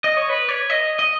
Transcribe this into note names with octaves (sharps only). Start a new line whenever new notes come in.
D#5
C#5
B4
C#5
D#5
D#5